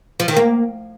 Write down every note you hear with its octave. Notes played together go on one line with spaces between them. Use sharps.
F3
D#3
A#3